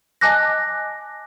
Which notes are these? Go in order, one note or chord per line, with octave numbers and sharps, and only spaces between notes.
D#5 G#5 A5 D6 F#6 A#6